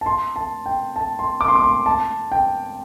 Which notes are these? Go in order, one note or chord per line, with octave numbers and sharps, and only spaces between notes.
A5
C6
A5
G5
A5
C6
D6
C6
D6
C6
A5
G5